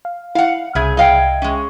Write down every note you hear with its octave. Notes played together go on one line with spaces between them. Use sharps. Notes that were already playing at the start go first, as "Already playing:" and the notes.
F5
E4 F5 F#5
C2 C#3 G#4 E5 G#6
D#5 F5 G5
G#3 C#4